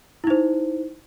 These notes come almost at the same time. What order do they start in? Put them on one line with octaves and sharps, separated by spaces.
E4 D#4 C5